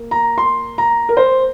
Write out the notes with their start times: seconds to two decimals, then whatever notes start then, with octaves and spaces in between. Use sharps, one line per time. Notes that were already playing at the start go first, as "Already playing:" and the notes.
Already playing: A#3
0.11 A#5
0.38 C6
0.78 A#5
1.09 A#4
1.17 C5